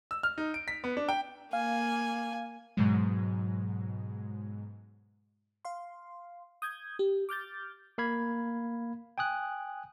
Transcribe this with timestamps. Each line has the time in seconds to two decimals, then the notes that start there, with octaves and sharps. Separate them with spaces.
0.11 E6
0.23 F6
0.38 D#4
0.54 D7
0.68 B6
0.84 B3
0.97 D4
1.09 G5
1.53 A#3 F5 G#5
2.77 G#2 B2 F#3 G#3
5.65 F5 C6
6.62 D#6 G6 G#6
6.99 G4
7.29 D6 F6 G6 A6
7.98 A#3 F5 B5 G#6
9.18 G5 G#5 D#6 F#6